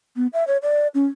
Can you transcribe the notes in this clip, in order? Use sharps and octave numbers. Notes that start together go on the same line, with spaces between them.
B3
E5
C#5
D5
C#4